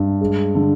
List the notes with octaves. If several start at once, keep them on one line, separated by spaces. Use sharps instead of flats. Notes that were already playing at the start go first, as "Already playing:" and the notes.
Already playing: G2
G#3
D3